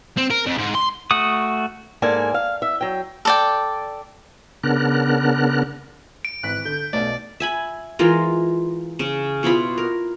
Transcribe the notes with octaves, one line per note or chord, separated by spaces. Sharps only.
C4
A#4
F2
G#2
C6
A3 F#4 D#6
G#2 A#3 A4 D5 G#5
F5
E5
F#3 G5
A4 D5 G5
C#3 B3 D4 A#4 F#6
D7
G#1 E3 F#6 B6
D3 G6
B1 B2 A3 D5
E5 G#5 B5
E3 G#3 F4 A#4
C#3
B2 E4 F4 B5
A#4